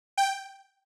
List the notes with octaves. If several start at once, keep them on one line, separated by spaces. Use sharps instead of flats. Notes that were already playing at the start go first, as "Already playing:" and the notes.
G5